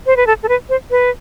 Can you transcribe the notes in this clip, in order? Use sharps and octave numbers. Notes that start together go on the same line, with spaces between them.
C5
B4
A4
A4
B4
C5
B4